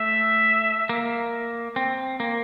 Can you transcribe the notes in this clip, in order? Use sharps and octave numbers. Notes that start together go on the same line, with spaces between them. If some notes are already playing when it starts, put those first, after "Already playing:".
Already playing: A3 E5
A#3
C4
A#3